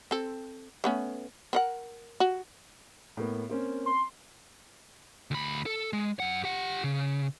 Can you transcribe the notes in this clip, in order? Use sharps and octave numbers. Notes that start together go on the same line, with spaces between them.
C4 A4
A3 B3 C#4
C4 A#4 F#5
F#4
A2 A#3 B3
A#3 C4 C#4
C6
D2 B5
A4
G#3
F#2 F#5
G4 F#5
C#3